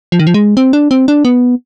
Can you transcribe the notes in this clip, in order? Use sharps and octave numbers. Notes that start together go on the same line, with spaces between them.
F3
D#3
F3
G#3
C4
D4
C4
D4
B3